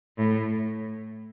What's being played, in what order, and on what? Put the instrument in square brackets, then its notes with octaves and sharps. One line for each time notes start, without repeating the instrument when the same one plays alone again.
[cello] A2